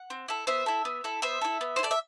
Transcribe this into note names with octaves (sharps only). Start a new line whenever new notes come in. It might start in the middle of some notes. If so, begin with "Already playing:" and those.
Already playing: F#5
C4
E4 A4
B3 C5 E5
E4 A4
B3
E4 A4
B3 C5 E5
E4 A4
B3
E4 C5
A4 D5
E5